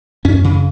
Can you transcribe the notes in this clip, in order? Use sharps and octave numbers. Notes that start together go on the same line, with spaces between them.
F#2 C#4
C#3